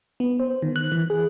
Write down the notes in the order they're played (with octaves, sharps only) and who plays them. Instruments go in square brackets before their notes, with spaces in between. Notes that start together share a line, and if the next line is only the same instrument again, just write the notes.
[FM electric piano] B3
C5
D#3
F#6
E3
G#4